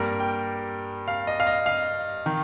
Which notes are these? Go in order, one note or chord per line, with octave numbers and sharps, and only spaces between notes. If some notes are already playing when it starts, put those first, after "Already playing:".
Already playing: G2 G3 A#3 A#4
G5
F5
D#5
F5
D#5
F5
D#3